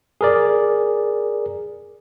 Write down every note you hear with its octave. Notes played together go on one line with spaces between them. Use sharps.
G#4 A#4 D5